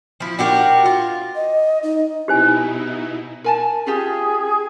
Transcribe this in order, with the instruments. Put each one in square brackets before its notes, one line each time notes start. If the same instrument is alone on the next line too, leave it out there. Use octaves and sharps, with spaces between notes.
[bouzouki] F3 E4
D4 F#4 G4 A#4
F4
[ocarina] D#5
D#4
[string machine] B2 D#4 E4 [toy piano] G4 C5 G#5
[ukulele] A#4 G#5 A5
[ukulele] C#4 F4 G4 [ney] G#4